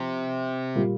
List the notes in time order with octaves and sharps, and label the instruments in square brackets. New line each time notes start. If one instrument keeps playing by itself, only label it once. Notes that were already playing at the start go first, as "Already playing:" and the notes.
Already playing: [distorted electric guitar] C3 [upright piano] F3
[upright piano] A#2 G3 A#3 F4